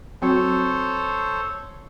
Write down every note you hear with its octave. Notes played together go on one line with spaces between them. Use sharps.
F#3 C4 F#4 A4 C5 C#5